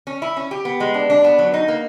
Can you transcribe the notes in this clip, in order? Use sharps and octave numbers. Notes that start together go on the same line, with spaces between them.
C#4
E4
C#4
G4
B3
G#3
D4
D4
B3
F#3
D#4
A#3